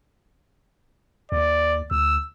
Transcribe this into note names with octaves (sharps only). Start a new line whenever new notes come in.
D#2 D5
D2 E6